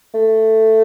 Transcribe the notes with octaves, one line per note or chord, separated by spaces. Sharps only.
A3